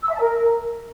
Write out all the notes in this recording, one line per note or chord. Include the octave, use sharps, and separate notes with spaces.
E6
E5
A5
A#4